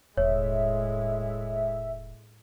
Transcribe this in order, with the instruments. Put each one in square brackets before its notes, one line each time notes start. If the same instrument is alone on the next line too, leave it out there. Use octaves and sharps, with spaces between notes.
[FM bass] E1 [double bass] A2 G#3 [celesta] C#5 [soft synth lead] E5